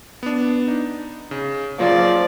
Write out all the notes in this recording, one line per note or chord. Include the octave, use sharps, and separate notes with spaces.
B3 D4
D#4
C#3
C#3 F3 F#3 A#3 D5